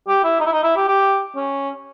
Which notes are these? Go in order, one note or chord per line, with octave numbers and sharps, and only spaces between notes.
G4
E4
D#4
E4
D#4
E4
G4
G4
C#4